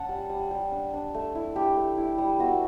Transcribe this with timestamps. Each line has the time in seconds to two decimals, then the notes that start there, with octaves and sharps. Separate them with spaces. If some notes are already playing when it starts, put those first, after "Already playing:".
Already playing: C#4 F#5 A5
0.09 G3
0.30 G3
0.51 G3
0.72 D4
0.93 D4
1.14 A3
1.35 E4
1.55 A3 G4
1.76 A3
1.97 E4
2.18 G3
2.39 B3 F#4